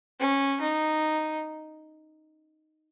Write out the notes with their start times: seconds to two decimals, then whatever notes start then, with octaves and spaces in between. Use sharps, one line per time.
0.20 C#4
0.61 D#4